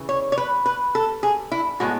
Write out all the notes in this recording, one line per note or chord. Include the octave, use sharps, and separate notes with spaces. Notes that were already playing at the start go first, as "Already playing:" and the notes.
Already playing: C#3 E3
C#5
C#5
B4
B4
A4
G#4
E4
A2 G#3 B3 F#4